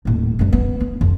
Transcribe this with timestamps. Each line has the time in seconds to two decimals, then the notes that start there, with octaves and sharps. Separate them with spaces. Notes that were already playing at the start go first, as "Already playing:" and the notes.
0.05 D#1 A2
0.39 F#2 G3
0.53 B3
0.80 B3
1.01 F2 F4